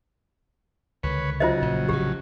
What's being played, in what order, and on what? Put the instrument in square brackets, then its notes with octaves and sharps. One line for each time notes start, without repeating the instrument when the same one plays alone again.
[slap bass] C#2 D3 D#3 [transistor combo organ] B4 C#5
[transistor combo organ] C#3 F#3 [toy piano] F4 C5 D#5
[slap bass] A#1 A#2
[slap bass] A#1 A2 C3 [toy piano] G4